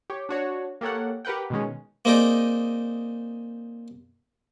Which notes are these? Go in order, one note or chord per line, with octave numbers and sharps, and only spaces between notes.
G4 C#5
D4 F#4 C#5
A#3 G4 A4 C#5 F#5
G4 A#4 B4 F#5 G5
B2 D#3 G#3 C#4
A#3 C4 D#4 G#4 D5